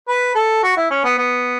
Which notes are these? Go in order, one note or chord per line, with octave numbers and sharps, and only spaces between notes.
B4
A4
F#4
E4
C#4
B3
B3